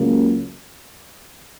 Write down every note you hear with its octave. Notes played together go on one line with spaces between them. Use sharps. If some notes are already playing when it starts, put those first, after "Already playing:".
Already playing: C#2 C#3 F#3 A#3